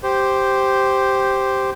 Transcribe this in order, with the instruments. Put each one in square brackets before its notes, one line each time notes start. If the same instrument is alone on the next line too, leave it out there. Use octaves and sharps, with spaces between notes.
[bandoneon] G4 C5